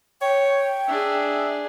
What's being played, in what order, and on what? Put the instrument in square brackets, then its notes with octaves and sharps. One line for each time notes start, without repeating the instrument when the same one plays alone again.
[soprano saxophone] C#5 [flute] G5
[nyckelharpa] D4 G#4 [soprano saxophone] E5